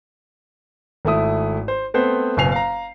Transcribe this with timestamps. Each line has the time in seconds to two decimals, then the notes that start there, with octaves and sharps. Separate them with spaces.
1.05 G#1 A3 E4 D#6
1.68 C5
1.94 A3 B3 C4 C5
2.37 F#1 B2 G#5 C7 F7
2.52 F5 A#5